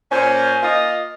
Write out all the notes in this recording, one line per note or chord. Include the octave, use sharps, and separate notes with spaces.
A#2 C#4 C5
A#3 F4 D#5